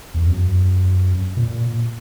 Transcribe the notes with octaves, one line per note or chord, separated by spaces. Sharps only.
E2
F#2
A#2